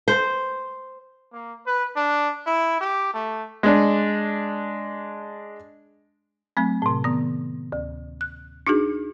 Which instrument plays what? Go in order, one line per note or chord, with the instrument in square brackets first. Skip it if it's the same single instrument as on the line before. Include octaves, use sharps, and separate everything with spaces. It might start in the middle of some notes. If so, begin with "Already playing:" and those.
[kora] C5
[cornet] A#3
B4
D4
E4
G4
A3
[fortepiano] G#3 D4
[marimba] F#3 A3 C4
A2 C3
D#3 B3
D2
F#6
D4 D#4 F#4 G#4